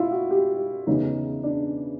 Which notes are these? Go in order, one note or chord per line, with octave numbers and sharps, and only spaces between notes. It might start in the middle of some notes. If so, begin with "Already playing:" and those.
Already playing: E4 F4
F#4
G4
E2 C#3 E3 D#4
D4